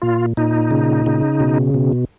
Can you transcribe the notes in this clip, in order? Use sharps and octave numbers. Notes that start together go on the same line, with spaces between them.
A#2 F4
A#2 D#4
C#3
C#3
B2
B2